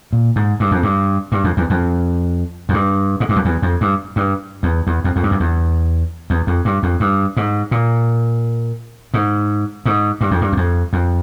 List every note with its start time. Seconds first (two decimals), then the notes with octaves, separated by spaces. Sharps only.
0.13 A#2
0.36 G#2
0.60 G2
0.71 F2
0.83 G2
1.32 G2
1.44 F2
1.57 E2
1.70 F2
2.69 F2
2.73 G2
3.20 G#2
3.29 G2
3.36 F2
3.45 E2
3.62 F2
3.81 G2
4.16 G2
4.63 E2
4.87 E2
5.04 F2
5.16 F2
5.23 G2
5.31 F2
5.40 E2
6.30 E2
6.47 F2
6.65 G2
6.83 F2
7.00 G2
7.37 G#2
7.71 A#2
9.14 G#2
9.86 G#2
10.21 G2
10.31 F2
10.41 G2
10.52 E2
10.57 F2
10.93 F2